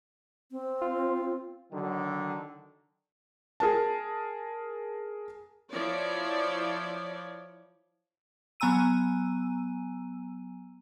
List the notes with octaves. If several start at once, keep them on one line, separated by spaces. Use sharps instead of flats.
C4
F4
D3 D#3 F#3
G#4 A#4 A5
F3 E4 C#5 D5
F#3 B3 G#5 A#5 E6 D#7